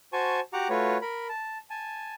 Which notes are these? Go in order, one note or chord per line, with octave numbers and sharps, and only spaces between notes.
F#4 C5 G#5 A5 C#6
F#4 G4 F#5 A#5 D6
A3 F4 F#4 B4 C#5
A#4 B5
A5
G#5 A5